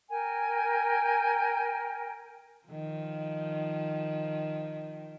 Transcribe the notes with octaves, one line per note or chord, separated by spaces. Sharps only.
A#4 G5 G#5
D#3 F3